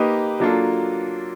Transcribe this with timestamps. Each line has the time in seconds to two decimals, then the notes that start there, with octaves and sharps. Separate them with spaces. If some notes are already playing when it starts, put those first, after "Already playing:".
Already playing: A#3 D#4 G4 B4 D#5
0.40 F#3 A#3 D4 F4 A4